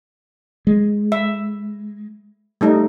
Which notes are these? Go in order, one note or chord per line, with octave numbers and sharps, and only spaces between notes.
G#3
E5
G3 A3 D#4